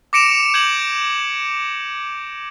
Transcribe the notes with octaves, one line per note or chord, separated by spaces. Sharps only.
D6 A#6 C#7 D7 E7 F7
G6 G#6 E7 F#7